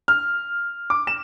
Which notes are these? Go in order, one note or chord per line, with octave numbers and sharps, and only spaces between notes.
F6
D6
E7